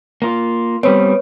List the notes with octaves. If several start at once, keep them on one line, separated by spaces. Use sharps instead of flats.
A#3 F4
G3 B3 C4 B4 C#5